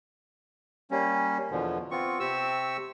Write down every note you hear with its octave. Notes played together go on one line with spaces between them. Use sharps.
G3 A#3 C#4
E2 B2 D3 F3
B3 C4 F4 C#6
C3 C4 G4 C#6 E6